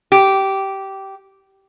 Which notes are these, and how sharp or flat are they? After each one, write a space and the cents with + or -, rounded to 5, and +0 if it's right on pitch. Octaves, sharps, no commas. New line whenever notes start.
G4 -15